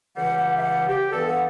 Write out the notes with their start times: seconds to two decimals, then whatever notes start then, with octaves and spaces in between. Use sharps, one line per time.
0.17 C#2 C#3 E3 G3 F#5
0.40 F#5
0.58 E5
0.63 F#5
0.88 G4
1.11 G2 E3 B3 A4
1.27 F#5